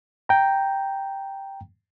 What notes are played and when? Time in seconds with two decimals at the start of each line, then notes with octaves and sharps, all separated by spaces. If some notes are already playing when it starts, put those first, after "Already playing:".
0.29 G5 A#5